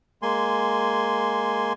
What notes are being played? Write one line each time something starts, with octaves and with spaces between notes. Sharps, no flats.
G#3 A#3 G#5 C6